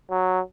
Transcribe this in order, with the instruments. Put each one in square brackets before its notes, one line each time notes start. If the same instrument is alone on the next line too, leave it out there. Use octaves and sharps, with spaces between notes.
[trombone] F#3